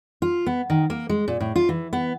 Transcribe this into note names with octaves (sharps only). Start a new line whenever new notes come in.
F4
B3
D#3
A#3
G#3
A#2
A2
F4
E3
B3